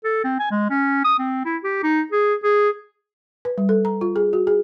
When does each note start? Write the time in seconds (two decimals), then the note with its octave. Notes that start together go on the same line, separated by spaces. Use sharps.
0.04 A4
0.24 C4
0.39 G#5
0.51 G#3
0.70 C#4
1.04 D#6
1.19 C4
1.45 E4
1.63 G4
1.83 D#4
2.12 G#4
2.43 G#4
3.45 B4
3.58 G3
3.69 A4
3.85 A#5
4.01 F4
4.16 G#4
4.33 F#4
4.47 G#4